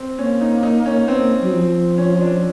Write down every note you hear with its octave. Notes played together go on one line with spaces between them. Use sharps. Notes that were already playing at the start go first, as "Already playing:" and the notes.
Already playing: C4
A#3 C#4
D#4
D#4
C#4
B3 C4
A#3
F#3
F3
C#4
D4